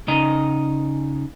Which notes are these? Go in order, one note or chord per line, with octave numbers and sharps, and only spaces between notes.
C#3 D#4 D#5 A#5